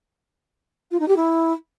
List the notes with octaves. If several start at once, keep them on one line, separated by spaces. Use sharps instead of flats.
F4
D#4
G4
E4